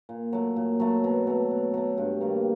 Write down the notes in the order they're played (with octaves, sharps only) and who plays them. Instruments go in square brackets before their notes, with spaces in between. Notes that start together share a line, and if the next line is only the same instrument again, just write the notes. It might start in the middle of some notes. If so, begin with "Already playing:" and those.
[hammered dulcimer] A#2
F#3 A3
A#2
F#3 A3
B2
F#3 A3
B2
F#3 A3
G2
D#3 G3 A#3